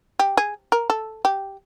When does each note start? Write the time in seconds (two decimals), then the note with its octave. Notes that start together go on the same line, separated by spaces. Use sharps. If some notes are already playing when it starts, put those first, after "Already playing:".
0.19 G4
0.37 G#4
0.72 A#4
0.90 A4
1.25 G4